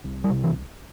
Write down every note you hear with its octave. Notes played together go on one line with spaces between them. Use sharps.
C2
G3
C3
E3